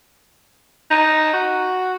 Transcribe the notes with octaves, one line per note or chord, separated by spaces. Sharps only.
D#4
F#4